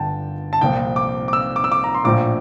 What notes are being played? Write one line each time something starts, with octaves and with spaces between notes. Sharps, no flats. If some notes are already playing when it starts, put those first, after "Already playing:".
Already playing: G1 G2 D3 G5 A5
A5
C2 A#2 F3 G5
D6
D6
E6
D6
E6
D6
A#5
C6
A#1 A2 F3 D6